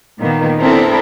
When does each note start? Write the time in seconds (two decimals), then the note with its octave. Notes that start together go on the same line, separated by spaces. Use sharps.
0.18 A#2 D#3 A#3 B3
0.59 B3 C4 D4 E4 A4 A#4